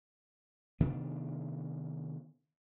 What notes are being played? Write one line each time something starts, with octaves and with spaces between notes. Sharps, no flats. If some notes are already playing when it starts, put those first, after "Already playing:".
C3 D#3 B3 D4